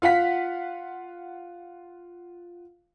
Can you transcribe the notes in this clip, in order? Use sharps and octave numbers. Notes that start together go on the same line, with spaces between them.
F4 F5 F#5 B6